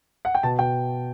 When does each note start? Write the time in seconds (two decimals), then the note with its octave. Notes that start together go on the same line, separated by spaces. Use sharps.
0.25 F#5
0.35 G5
0.43 B2 A5
0.59 B2 G5